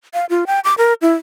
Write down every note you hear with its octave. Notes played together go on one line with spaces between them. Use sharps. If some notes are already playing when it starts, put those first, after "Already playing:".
F5
F4
G5
D6
A#4
E4